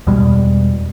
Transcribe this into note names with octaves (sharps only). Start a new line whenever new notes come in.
E2 B2 G3 G#3